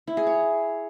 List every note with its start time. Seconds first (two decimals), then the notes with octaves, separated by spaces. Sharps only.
0.07 E4
0.17 G#4
0.27 C#5